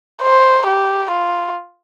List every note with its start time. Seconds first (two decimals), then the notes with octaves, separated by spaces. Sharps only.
0.22 C5
0.67 G4
1.11 F4